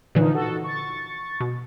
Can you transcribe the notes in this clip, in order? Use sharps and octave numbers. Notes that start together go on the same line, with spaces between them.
A#2 D3 E3 F3 D#4
F#4 A4
C#6 A6
B2